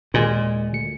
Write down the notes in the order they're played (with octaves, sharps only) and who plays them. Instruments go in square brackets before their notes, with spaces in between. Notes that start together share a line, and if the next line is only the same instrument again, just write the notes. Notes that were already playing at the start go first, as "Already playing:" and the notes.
[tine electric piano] D#2 G#3 G#5 [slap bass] A#2
[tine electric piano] D2 C#7